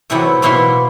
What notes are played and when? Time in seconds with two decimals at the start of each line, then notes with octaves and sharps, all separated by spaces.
0.10 A2 C3 E3 F#3 E4 F#5
0.42 B2 A#3 E4 E5 F#5 C6